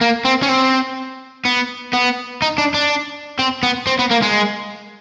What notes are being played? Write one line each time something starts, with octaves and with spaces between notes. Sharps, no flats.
A#3
C4
C#4
C4
B3
B3
D#4
D4
D4
C4
B3
C4
B3
A#3
G#3